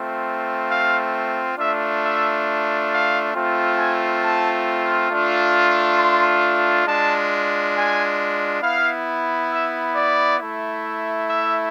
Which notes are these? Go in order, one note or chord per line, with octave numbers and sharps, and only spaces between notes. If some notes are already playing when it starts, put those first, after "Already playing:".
Already playing: A3 C4 F4
F5
A3 D4 F4 E5
E5
F5
A3 C4 F4
G#5
A5
A3 D4 F4
C6
G#3 D4 F4 A5
G#5
B3 E4 F5
E5
D5
A3 E4
E5